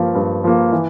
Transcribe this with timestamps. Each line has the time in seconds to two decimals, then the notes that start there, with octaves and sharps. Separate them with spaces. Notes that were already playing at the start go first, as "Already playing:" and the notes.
Already playing: G2 F3 A#3
0.15 G2
0.44 F3 A#3
0.72 E3